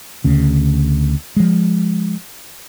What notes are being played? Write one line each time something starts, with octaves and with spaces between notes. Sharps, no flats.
D2 C#3
F3 G#3